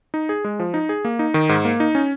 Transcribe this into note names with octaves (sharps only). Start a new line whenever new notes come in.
D#4
G#4
G#3
F3
D#4
G#4
A#3
D#4
D#3
G#2
A#3
D#4
C#4